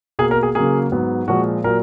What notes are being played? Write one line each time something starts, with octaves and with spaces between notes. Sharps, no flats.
B2 A#3 G#4
A#4
G#4
C#3 F#3 A#3 G#4
G#2 F#3 B3
A#2 F3 G#3 F#4
A#2 F#3 A#4